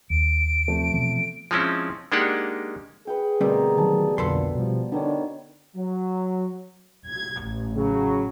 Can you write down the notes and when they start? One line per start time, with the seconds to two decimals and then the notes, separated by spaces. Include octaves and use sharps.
0.10 D#2 D7
0.68 C3 F3 A3
0.92 B2 E3 B3
1.51 F3 G#3 C4 C#4 E4
2.12 G#3 A#3 D4 D#4 G4 F#5
3.07 G#4 B4 F#5 G5
3.41 D2 B2 G3 C4 A#4 C5
3.77 D#3 F#3 D5 A5
4.18 B1 F2 A#2 D3 A4 B4 C6
4.55 B2 F3 G3
4.92 D3 D#3 B3 D4 C#5
5.76 F#3
7.07 G#6
7.42 A1
7.76 C#3 F#3